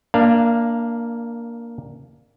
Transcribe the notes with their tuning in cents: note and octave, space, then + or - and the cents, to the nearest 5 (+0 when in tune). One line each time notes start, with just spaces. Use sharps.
A#3 +0 D4 +10 F5 -25